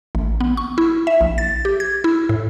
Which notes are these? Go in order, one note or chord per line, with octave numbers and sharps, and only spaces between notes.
A1
B3
C#6
E4
E5
A#1
A6
G4
G#6
E4
A2